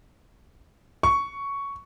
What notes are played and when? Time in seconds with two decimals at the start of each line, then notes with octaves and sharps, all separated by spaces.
1.03 C#6